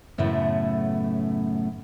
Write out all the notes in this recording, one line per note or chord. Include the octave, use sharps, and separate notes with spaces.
F#2 A2 C#3 A3 B3